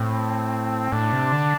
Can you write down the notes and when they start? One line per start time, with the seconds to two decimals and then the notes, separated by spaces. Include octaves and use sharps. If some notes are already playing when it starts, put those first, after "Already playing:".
Already playing: A2 C4
0.92 A2 D4
1.13 C3
1.32 D3